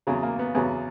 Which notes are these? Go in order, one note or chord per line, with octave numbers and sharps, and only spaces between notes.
E2 C#3 F#3
A#3
B3
E2 C#3 F#3 B3